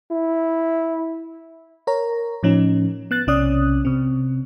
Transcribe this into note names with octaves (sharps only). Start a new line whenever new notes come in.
E4
A#4 C#5 A#5
A2 F3 C#4 D#4
B3 F#6 A6
B1 C3 C#4 D5 D#6 F#6
C3 C4